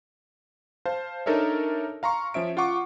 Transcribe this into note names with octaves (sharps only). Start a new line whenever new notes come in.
C5 F5 A5
D4 D#4 A4 A#4 C#5 E5
F5 A#5 C6 C#6
F3 C#4 E5 D7
F4 F#5 C#6 D6